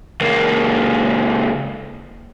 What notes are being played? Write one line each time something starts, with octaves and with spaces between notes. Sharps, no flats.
C#2 A#3